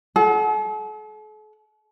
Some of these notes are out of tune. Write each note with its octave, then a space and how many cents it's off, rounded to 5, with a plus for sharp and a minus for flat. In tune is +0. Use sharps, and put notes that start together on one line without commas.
A4 -45 F#5 +0